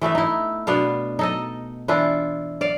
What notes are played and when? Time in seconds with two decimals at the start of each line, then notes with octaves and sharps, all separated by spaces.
0.01 E3 A3 B3 E5
0.15 D#4 E4
0.67 B2 B3 D4 F5
1.19 D#4 A4 D#5
1.88 E3 D4 E4 F4
2.61 D5 F5